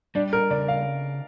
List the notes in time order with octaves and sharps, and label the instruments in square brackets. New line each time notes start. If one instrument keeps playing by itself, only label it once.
[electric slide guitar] G3 [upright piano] D4
[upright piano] A#4
[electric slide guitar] C#3 [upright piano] D5
[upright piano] F5